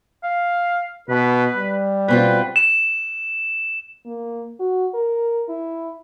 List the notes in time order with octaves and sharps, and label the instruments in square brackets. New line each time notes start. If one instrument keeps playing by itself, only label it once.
[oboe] F5
[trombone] B2 [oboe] B4
[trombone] G3
[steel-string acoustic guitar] B2 C4 F4 [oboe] B4
[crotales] E7
[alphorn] A#3
F#4
A#4
E4